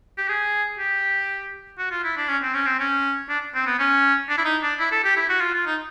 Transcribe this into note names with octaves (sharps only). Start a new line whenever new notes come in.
G4
G#4
G4
F#4
F4
E4
D4
C#4
C4
C#4
C4
C#4
D4
C4
B3
C#4
D4
E4
D#4
D4
E4
A4
G4
E4
F#4
F4
F4
D#4